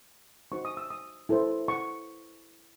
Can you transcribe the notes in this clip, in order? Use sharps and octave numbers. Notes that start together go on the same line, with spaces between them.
D#4 F#4 C5 C#6
D#6
E6
D#6
E4 A4 C5
C#6